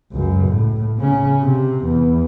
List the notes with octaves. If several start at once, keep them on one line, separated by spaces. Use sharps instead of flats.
C#2 F#2
A2
C#3 C#4
C3
E2